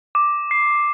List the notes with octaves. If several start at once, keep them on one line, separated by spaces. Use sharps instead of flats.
D6
C7